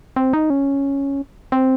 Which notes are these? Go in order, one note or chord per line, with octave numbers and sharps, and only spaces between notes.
C4
D#4
C#4
C4